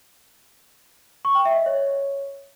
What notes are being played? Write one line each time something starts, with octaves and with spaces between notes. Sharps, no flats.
C#6
G5
E5
D#5
C#5